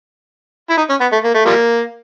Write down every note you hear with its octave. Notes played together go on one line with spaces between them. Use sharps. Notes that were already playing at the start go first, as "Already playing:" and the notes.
E4
D#4
C#4
B3
A3
A#3
A3
F3 G3 A#3